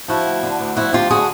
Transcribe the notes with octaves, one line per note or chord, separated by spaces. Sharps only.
F3 E4 F#4
D2
D3
D2
F3 E4 F#4
D2 F4 G4
D3 F#4 G#4